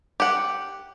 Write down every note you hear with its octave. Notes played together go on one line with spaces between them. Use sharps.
G4 F#5